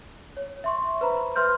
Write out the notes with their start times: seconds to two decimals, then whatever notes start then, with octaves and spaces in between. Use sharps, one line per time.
0.37 C#5
0.64 E5 C6 C#6
1.01 B4 C5 A#5 B5
1.36 B4 E5 C6 F6 G6